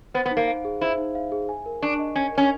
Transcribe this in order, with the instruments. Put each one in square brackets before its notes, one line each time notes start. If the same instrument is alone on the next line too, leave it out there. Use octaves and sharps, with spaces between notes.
[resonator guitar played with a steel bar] B3 [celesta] C5
[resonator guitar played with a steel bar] B3
[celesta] D#4
[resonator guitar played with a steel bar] A#3
[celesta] F5
G#4
[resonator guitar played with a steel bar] E4 [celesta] C5
[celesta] D#4
F5
G#4
G#5
A#4
[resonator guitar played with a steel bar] D4 [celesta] C#6
[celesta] D#5
[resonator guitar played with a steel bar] C#4 [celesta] G#5
[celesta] A#4
[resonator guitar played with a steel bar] C#4